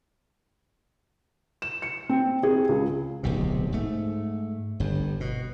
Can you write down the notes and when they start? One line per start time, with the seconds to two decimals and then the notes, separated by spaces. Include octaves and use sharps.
1.62 E7
1.82 C#7
2.09 C4
2.43 G#4
2.69 C#2
3.23 D1 B1 C3
3.72 G#2 A3
4.80 G1 G2
5.20 B2